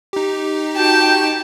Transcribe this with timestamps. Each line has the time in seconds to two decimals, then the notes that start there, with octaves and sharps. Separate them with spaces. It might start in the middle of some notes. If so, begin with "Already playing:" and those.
0.13 D#4 G4
0.76 F#4 G5 A5